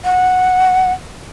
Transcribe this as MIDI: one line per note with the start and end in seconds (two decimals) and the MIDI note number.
0.04 0.91 78